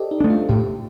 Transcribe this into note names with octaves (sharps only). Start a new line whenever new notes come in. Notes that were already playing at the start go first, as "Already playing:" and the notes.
Already playing: G4 A4 C5 D5 D#5
D#4
A3 D4
F4
A2 G4